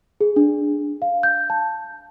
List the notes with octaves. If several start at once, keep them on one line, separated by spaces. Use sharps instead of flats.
G#4
D4
F5
G6
A5